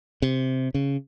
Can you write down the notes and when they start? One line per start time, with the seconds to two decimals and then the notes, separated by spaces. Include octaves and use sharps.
0.22 C3
0.74 C#3